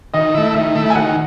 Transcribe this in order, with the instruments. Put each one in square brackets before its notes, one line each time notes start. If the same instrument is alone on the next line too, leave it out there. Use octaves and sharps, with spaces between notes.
[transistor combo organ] D#3 [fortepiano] D#5
[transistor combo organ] A3 E4
[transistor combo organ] D#3 [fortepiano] E5
[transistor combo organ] A3 E4
[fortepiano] G#5
[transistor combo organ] D#3 [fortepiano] F#5